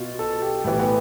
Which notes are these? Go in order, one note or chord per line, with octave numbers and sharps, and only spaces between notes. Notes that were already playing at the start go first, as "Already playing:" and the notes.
Already playing: B2 F4
A4
G4
A2 E3 G4
B3